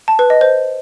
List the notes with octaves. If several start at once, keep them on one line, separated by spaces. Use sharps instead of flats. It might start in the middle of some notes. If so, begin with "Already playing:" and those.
A5
B4
D#5
C5